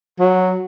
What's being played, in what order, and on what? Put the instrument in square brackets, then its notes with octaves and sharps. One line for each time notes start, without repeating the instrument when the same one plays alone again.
[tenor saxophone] F#3